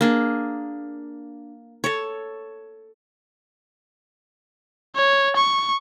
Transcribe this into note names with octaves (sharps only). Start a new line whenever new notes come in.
A#3 D4 G#4
A4 C#5
C#5
C#6